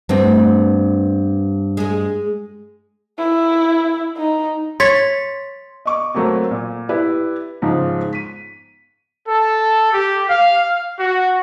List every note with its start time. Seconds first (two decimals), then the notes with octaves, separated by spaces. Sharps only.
0.09 G2 A3 B3 C4
1.77 G#3 G#4
3.18 E4
4.17 D#4
4.80 C#5 C6 A6 B6
5.86 D#5 C#6 D6
6.14 F#3 A3 A#3 C4
6.51 A#2
6.89 E4 G4 B4 D5
7.62 G#2 C#3 F3 G#3
8.13 B6 D#7
9.28 A4
9.93 G4
10.29 F5
10.99 F#4